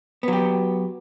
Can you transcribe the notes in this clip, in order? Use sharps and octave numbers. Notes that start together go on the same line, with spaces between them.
F#3 B3 G4